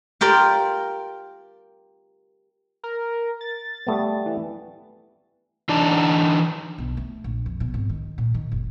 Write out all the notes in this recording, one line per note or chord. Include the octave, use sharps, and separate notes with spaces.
F4 G4 A#4 D5
A#4
A6
G3 A3 B3
E3
E3 D4 D#4 A5
B1
A3
A#1
F2
B2
G#1
D#3
A#2
D#3
F#1